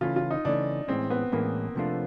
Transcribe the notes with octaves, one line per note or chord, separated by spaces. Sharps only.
C#3 E3 A3 C#4 F4
F4
D#4
C#3 E3 A3 C#4 D4
A2 E3 G#3 C4 C#4
B3
A2 E3 G#3 A#3 C#4
C3 F3 A3 D4 F4